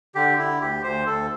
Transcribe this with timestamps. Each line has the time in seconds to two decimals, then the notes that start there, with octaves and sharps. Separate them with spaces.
0.15 D3 G4
0.38 D3 E4
0.61 D2 G4
0.83 D2 C5
1.06 D2 A4